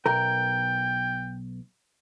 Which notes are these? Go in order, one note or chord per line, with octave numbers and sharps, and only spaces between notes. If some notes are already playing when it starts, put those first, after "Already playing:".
B1 A#4 G5